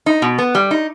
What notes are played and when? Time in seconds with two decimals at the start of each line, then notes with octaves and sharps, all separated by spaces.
0.06 D#4
0.22 B2
0.38 B3
0.55 G3
0.71 D#4